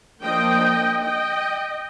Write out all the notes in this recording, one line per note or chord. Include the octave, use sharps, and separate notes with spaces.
F3 A#3 D4 D#5 G5
D#5 G5